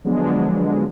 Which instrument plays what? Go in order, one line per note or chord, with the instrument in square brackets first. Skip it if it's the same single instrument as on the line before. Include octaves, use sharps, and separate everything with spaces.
[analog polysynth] D3 F3 F#3 G#3 B3 D4